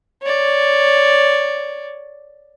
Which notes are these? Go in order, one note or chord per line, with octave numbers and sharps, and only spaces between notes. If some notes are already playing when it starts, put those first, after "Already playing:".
C#5 D5